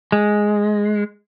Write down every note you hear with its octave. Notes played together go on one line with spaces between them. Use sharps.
G#3